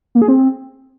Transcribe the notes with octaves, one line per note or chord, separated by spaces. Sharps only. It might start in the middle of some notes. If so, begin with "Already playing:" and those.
A#3
G#4
C4